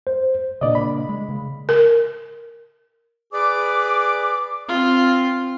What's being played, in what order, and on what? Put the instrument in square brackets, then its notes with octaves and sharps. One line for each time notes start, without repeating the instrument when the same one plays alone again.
[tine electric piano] C5
[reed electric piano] A#2 D5 D#5 [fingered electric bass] C#3 A#3 D4
[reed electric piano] B5
[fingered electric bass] G#3
C#3
[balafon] A#4
[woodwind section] G#4 B4 D5 D6
[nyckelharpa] C4 F4